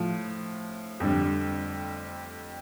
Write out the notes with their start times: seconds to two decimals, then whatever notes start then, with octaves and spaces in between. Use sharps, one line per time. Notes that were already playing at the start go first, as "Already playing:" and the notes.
Already playing: A2 F3
1.00 F2 D3 G3